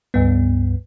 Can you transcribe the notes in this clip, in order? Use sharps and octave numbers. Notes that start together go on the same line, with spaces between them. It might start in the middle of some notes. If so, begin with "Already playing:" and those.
C#2 G2 B3